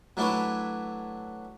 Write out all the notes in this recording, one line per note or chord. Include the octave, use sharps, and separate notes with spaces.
F#3 A3 D4 E4 B4 C#5